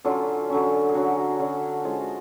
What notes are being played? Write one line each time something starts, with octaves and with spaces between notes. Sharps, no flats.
D3 F#3 C#4 F4
D3 F#3 C#4
G#4
D3 F#3 C#4 F#4
D3 F#3 C#4
F3 G#3 C#4 F4
F#4